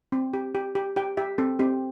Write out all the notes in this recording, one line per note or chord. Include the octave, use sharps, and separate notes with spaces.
C4
G4
G4
G4
G4 G5
G4 E5
C4 A4
C4 G4